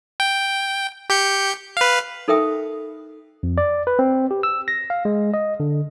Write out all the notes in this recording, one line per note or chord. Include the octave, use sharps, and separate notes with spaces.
G5
G4 G6 C#7
B4 F5
D#4 A4 A#4 E5 G5 D#6
F2
D5
B4
C4
G4
E6
A#6
F5
G#3
D#5
D3